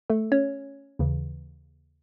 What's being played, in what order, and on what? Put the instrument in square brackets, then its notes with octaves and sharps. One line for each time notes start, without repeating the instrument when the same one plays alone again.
[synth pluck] A3 A4
C#4 C#5
D#2 C#3 E3